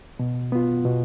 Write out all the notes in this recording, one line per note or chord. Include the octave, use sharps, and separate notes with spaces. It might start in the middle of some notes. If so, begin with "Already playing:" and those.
B2
B3 F4
B2